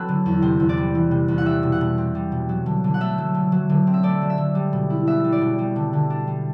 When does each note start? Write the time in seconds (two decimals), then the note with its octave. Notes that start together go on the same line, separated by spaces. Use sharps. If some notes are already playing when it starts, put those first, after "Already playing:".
Already playing: F#3 C4 A4 B4
0.09 D3
0.26 E2
0.42 C3 C5
0.60 E2
0.69 D5
0.77 G3
0.95 E3
1.11 C3
1.28 E2
1.38 F#5
1.45 G3 E5
1.63 B2
1.72 F#5
1.81 B2
1.98 C4
2.15 G3
2.32 B2
2.49 F#3
2.66 D3
2.84 D3
2.94 F#5
3.01 A3 E5
3.18 F#3
3.35 D3
3.52 F#3
3.70 D3
3.87 C4
3.94 E5
4.03 A3 D5
4.22 F#3
4.30 E5
4.38 D3
4.55 G3
4.73 B2
4.90 E4
5.07 B3 E5
5.24 G3
5.32 D5
5.41 B2
5.59 G3
5.76 D3
5.93 D3
6.10 D4
6.27 G3